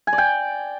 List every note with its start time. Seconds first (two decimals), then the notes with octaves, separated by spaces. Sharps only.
0.07 G#5
0.13 D5
0.18 G5